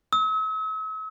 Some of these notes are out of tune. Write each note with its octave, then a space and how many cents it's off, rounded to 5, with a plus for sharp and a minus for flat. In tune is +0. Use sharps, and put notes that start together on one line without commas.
E6 -45